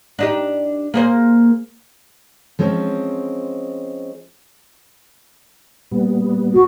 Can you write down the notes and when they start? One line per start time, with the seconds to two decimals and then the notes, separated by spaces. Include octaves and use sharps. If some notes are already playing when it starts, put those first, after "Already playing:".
0.19 D4 D#4 G4
0.94 A#3 G#4 C5
2.59 F3 G#3 C4 C#4 D#4
5.92 A#2 G3 B3
6.53 F#4